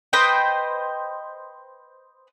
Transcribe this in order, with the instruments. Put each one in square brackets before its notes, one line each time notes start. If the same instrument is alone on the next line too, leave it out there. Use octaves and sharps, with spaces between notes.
[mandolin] B4 C5 D#5 G5